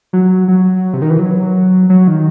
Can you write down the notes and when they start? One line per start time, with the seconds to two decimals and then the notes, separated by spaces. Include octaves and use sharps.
0.13 F#3
0.48 F#3
0.93 C3
1.02 D#3
1.10 E3
1.19 F#3
1.90 F#3
2.08 D#3